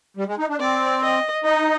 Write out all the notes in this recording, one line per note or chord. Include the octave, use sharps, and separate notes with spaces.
G3
G#3
D#4
D4
C4 D5
D#5
D#4 D#5